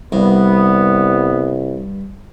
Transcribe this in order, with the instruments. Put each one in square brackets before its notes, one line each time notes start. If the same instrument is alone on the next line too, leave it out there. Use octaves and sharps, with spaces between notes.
[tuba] C2 [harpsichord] G2 [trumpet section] B3